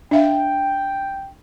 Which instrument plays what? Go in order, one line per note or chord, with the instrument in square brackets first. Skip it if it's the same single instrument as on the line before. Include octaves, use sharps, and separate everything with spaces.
[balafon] D4 E5 F5 [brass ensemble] G5